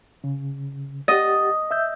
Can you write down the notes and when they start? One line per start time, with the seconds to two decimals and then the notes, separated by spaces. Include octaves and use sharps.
0.24 C#3
1.08 G4 D#5 F#5 A6
1.71 E5 E6 G6